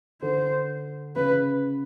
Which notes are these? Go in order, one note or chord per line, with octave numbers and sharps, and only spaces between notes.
D3 C5
C#3 B4